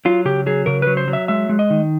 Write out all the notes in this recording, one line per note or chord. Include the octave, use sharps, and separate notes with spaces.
F#3 F4
C#3 G4
F#3 G#4
C#3 A#4
F#3 B4
C5
F#3
E5
G#3 E5
G#3
D#5
D#3